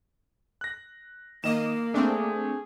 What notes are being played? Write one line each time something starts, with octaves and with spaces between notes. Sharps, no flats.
F#6 A#6
D#3 A#3 D#5 E7
A3 C4 D4 G#4